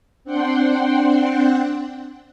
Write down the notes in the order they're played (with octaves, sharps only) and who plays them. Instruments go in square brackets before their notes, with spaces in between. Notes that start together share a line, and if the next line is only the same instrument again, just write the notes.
[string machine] C4 D4 F#5 G5 C6